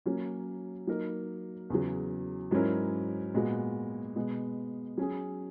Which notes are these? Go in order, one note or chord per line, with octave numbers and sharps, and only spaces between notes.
F#3 A#3 C#4
F#3 A#3 D#4 A#4
E2 C#3 F#3
G#2 F#3 C#4 E4 A#4
A#2 G#3 B3 F#4
B2 G#3 B3
F#3 C#4 G#4